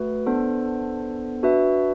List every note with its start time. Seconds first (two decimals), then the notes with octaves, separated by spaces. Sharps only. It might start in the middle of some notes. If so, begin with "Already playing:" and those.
Already playing: A3 F#4 B4
0.26 B3 D4 A4 C5
1.43 D4 F#4 B4 E5